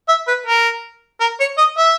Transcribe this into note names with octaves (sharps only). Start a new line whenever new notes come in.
E5
B4
A#4
A#4
C#5
D#5
E5